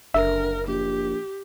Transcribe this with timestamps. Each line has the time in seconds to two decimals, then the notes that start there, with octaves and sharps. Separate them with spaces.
0.14 F#1 D3 A#4 E5
0.67 A#1 G4